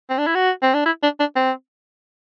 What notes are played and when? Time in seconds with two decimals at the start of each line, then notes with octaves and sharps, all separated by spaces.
0.10 C4
0.18 D4
0.27 E4
0.35 F#4
0.63 C4
0.74 D4
0.86 E4
1.03 D4
1.20 D4
1.36 C4